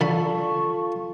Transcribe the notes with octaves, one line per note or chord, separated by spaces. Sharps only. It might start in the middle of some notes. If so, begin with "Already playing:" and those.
D3 F4 A4 B5 C#6